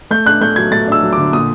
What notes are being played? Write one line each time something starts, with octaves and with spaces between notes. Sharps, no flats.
A3 G6
D4 F#6
A3 G6
F#3 G#6
A3 A6
D4 E6
F#3
D3 D6
A#2 D#6